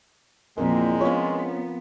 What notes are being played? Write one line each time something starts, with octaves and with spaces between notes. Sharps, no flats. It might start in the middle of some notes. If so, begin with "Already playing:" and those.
E2 A#2 F3 G#3 C4 A#4
B3 C#4 F4 C#5